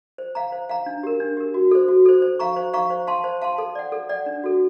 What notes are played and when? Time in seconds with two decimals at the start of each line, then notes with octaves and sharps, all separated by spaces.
0.18 C5
0.35 F5 A#5
0.52 C5
0.69 F5 A#5
0.86 D4
1.03 G4 A#4
1.20 D4
1.37 G4 A#4
1.54 F#4
1.71 A4 C5
1.88 F#4
2.05 A4 C5
2.22 C5
2.39 F5 A#5 C#6
2.56 C5
2.74 F5 A#5 C#6
2.90 C5
3.07 F5 A5 C6
3.24 C5
3.42 F5 A5 C6
3.58 A4
3.75 D5 F#5
3.92 A4
4.09 D5 F#5
4.26 D4
4.44 F#4 A4